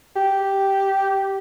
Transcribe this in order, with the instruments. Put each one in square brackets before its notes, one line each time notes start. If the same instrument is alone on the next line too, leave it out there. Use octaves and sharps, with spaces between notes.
[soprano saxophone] G4